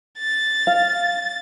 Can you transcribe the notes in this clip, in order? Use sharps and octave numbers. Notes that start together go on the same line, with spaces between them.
A6
F5